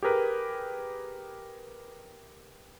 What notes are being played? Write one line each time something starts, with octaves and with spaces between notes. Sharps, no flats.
G4 G#4 A#4 B4